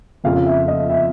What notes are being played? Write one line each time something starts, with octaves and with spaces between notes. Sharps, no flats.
F2 C#3 F3 F5
E5
D#5
E5